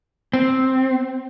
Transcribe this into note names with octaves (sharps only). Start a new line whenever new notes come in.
C4